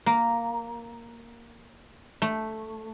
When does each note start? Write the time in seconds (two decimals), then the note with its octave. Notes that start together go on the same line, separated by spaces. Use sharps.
0.06 A#3
2.22 A3